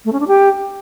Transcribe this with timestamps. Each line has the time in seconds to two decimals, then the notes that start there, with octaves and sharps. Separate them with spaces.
0.05 A3
0.13 C#4
0.20 D4
0.28 G4